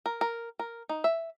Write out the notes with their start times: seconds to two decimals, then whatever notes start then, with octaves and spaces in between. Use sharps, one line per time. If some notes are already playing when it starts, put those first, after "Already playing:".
0.06 A#4
0.21 A#4
0.59 A#4
0.89 D#4
1.04 E5